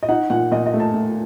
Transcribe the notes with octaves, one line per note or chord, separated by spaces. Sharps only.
D#5
D#4 F#5
A#2 F#5
A#2 D#5
D#5
A3
A5
A3